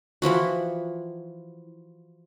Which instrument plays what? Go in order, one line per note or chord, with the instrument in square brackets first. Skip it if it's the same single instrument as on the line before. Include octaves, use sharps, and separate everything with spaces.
[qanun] E3 F3 E4 F#4